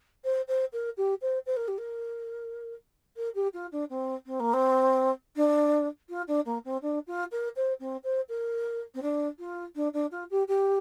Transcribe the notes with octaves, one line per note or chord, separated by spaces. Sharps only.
C5
C5
A#4
G4
C5
C5
A#4
G4
A#4
A#4
G4
F4
D4
C4
C4
A#3
C4
D4
F4
D4
A#3
C4
D4
F4
A#4
C5
C4
C5
A#4
C4
D4
F4
D4
D4
F4
G4
G4